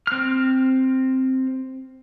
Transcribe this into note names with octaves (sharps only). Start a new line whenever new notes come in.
C4 F6